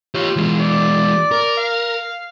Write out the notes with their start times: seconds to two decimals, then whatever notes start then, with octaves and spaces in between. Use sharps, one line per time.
0.15 F4 G4 C#5
0.36 E3 G#3
0.59 D5
1.31 A#4
1.57 F5